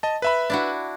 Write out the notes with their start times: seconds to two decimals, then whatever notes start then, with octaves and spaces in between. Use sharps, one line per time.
0.03 D#5 A5
0.22 B4 E5 B5
0.50 D4 E4 F#4